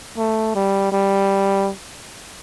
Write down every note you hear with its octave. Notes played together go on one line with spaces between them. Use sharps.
A3
G3
G3